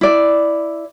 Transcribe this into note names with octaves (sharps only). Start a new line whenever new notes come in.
E4 D5